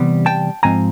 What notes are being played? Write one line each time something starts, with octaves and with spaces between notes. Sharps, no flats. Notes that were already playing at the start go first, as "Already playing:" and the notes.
Already playing: C3 E3 G3 B3
G5 A5
G#2 F3 G#3 C4 G#5 A#5